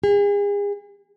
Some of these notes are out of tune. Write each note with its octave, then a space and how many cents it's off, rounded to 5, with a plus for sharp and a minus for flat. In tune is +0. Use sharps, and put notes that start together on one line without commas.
G#4 -40